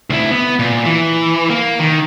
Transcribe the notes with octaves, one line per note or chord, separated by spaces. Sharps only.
D2 E4
B3
A#2
E3
A#3
D#3